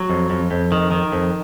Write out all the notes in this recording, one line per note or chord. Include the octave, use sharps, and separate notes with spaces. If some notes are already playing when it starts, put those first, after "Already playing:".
Already playing: F#3
F2
F2
F2
D#3
D#3
F2